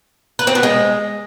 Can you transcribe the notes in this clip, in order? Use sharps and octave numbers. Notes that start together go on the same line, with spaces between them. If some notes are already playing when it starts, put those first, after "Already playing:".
B4
C4
B3
G#3